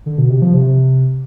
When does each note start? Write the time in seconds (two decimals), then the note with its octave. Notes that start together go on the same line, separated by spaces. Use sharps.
0.06 D3
0.18 B2
0.30 C3
0.42 F3
0.54 C3